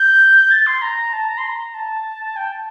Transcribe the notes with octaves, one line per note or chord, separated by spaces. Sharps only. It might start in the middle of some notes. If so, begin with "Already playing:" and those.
Already playing: G6
A6
C6
A#5
A5
A#5
C6
A#5
A5
G5
A5